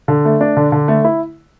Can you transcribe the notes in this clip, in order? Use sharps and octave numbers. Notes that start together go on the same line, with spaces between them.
D3
A3
D4
D3
D3
A3
E4